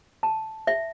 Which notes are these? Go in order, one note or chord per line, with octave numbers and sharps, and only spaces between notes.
A5
E5